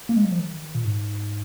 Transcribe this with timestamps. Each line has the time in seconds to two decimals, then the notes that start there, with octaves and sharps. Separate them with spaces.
0.09 A#3
0.16 G#3
0.25 F#3
0.31 F3
0.39 D#3
0.75 A#2
0.85 G#2